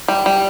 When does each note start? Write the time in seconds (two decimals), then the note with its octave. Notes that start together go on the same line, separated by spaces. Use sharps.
0.08 G3
0.26 G3